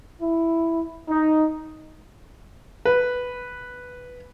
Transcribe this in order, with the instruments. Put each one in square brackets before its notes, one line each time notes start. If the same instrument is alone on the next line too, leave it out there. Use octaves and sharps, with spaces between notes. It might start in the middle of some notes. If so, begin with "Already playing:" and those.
[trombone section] E4
D#4
[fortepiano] B4